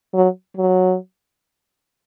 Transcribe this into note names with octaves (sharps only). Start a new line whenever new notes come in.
F#3
F#3